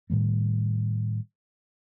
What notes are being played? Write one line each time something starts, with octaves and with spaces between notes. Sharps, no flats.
A2 D#3 G3 A3